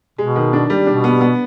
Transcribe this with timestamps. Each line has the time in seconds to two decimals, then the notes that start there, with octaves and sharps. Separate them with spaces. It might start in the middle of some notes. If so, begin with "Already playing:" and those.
0.18 B2 G#3
0.36 D#3
0.53 D4
0.70 G3
0.87 B2 D4
1.04 B3
1.21 B3